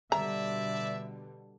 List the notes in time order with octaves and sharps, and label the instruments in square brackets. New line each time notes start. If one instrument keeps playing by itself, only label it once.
[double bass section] B2 D3 G3 [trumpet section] D5 E5 [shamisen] A#5